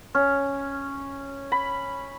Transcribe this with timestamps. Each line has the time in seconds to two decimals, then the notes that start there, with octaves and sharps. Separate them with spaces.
0.15 C#4
1.52 B5